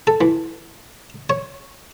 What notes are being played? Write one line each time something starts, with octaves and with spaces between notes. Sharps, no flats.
A4
E3
C#5